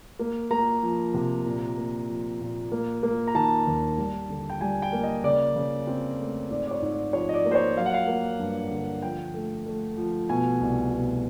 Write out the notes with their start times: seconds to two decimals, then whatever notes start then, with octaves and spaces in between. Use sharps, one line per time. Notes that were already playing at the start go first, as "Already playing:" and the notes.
0.19 A#3
0.51 A#3 A#5
0.83 F3
1.14 C3
1.46 A#2
1.77 A#3
2.09 F3
2.40 A#2
2.72 A#3
3.03 A#3
3.27 A#5
3.35 D#3 A5
3.67 D#2
3.98 G3
4.30 D3
4.50 G5
4.61 G3 G#5
4.82 G5
4.93 A#3
5.03 D#5
5.24 C#3 D5
5.56 C#3
5.87 C4
6.19 A3
6.51 G#2 D5
6.67 D5
6.71 C#5
6.82 G#2
6.93 D5
7.13 F3 C#5
7.29 D#5
7.34 D5
7.45 A#3
7.51 C5
7.55 C#5
7.77 F#3 F5
7.86 F#5
7.94 F5
8.08 A#3
8.40 G2
8.71 D3
9.02 F3 G5
9.34 A3
9.66 A3
9.97 F3
10.29 B2 G#5
10.61 C2
10.93 B2